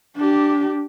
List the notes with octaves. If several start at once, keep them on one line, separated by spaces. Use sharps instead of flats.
D4 G4